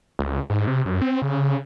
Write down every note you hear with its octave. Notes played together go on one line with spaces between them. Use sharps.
C#2
G#2
C3
F#2
C4
C#3